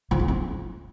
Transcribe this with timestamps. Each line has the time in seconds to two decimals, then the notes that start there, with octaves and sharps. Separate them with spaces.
0.11 F3
0.20 A3
0.28 C#4